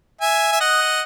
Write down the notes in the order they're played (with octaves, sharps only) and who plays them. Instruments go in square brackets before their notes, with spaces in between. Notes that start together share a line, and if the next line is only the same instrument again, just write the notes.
[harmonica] E5 G#5
E5
D#5 F#5